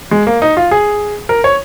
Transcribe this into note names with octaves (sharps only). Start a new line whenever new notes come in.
G#3
A#3
D#4
F4
G#4
A#4
C#5